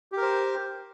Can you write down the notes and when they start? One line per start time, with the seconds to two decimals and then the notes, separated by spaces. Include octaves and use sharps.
0.12 G4
0.17 A#4
0.22 C5